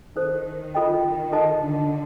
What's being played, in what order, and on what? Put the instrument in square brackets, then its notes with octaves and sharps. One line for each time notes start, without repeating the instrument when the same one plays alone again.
[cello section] D#3 [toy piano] D#4 A4 C5
[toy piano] F4 A4 D#5 G5
[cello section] D#3
[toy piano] A4 D#5 A5
[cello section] D3